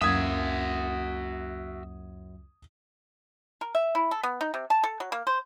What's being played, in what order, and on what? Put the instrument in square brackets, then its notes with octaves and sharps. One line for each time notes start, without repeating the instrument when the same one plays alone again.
[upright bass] C#2 [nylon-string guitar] F#2 A#3 E4 [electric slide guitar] F#4 E5 [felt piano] D#6 G#6
[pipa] A#4
E5
E4
A4
B3
D#4
C3
A5
A4
F#3
A#3
C5